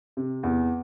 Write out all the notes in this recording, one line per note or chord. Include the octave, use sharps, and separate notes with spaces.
C3
E2